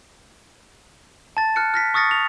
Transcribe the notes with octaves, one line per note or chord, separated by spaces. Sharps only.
A5 A6
F6 F#6 C#7
F6 A#6 B6
C#6 D#6 F6 A6 A#6 C#7
F7